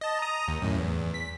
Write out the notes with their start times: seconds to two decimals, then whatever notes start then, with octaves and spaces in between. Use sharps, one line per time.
0.01 D#5 A5
0.19 A#5 D#6
0.48 D#2
0.62 F#2 A2
0.78 E2
1.14 B6